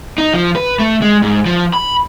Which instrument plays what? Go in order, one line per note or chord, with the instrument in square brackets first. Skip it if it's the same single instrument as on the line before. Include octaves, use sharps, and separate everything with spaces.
[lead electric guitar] D#4
F3
B4
A3
G#3
G#2
F3
B5